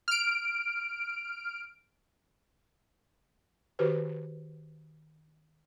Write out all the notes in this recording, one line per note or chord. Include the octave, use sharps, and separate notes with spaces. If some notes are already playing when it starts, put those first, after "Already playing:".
F6 D7
D#3 F#4 G4 B4 C5